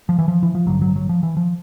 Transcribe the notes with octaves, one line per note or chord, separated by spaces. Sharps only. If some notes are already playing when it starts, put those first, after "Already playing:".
F3
E3
F3
E3
F3
A1 G2 D3 F#3
F#3
F#3
F3
E3
F3